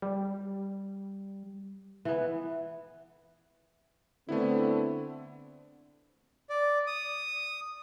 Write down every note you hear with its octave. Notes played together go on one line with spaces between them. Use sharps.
G3
E3 B3
D3 A3 B3 C4 E4
D5
D#6